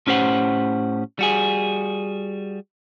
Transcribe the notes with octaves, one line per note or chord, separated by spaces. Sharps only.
A2 C#4 G4 C5 F#5
G3 F#4 G#4